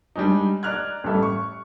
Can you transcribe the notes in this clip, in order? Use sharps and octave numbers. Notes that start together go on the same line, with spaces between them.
G3 G#3 D4 D#4
D5 D#5 A#5 F6 F#6 G#6
A1 G3 A4 E5
C#6